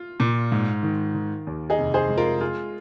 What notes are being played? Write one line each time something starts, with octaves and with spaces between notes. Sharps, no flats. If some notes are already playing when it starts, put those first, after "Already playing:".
Already playing: F4
A#2
G#2
D#3
D#3
D#2
D#4 G#4
F1
G#4 C5
G#3
F4 A#4
F4 G#4